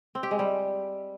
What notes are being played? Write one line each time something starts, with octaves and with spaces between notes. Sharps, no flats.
C4
G4
G#3
G3